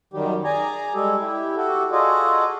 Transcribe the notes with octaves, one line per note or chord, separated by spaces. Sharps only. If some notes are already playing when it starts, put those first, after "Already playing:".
F#2 D#3 F#3 G3 G4
G#4 D5 G#5 A#5
G3 G#3 G4 A4
E4 G4
F#4 G4 A4
F4 F#4 G#4 A4 D5 D#5